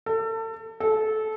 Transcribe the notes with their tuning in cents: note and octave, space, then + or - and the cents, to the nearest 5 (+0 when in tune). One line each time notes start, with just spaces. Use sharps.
A4 +30
A4 -20